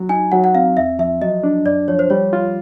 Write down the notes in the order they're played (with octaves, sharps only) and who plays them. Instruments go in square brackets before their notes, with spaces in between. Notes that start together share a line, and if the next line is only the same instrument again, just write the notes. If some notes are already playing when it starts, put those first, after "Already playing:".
Already playing: [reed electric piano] F#3
[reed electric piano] D#4 [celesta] G#5
[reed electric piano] F#3 [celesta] F#5
[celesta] F#5
[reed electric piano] C4 [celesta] F5
[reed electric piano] E2 [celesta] E5
[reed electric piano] F3 [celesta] E5
[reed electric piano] F#3 [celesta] D#5
[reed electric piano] D4
[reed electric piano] F#2 [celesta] D5
[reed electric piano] F3 [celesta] C#5
[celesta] C5
[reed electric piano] G3 [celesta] C#5
[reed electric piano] F4